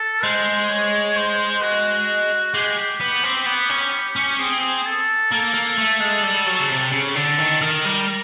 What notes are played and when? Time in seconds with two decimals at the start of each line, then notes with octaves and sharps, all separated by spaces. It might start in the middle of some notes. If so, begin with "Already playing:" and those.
Already playing: A4
0.23 G#3 C5
0.70 C#5
1.16 C5
1.62 F#4
2.54 G#3 G4
3.00 B3
3.24 C4
3.46 B3
3.70 C#4
4.16 C#4
4.39 C4 G#4
4.86 A4
5.31 A#3 A4
5.54 A#3
5.78 A3
6.00 G#3
6.23 G3
6.47 F#3
6.60 C#3
6.70 C3
6.93 C#3
7.16 D3 A4
7.39 D#3
7.61 D#3 A#4
7.85 G3
8.08 A#4